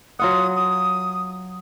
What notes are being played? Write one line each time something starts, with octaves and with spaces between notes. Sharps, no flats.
F#3 F4 F#5 D#6
D#6